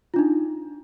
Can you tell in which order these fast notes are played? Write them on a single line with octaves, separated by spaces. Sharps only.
F4 D4 D#4